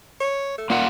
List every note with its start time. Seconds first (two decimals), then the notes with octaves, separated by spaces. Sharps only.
0.21 C#5
0.58 A3
0.70 A#2 A#3 F4 F#5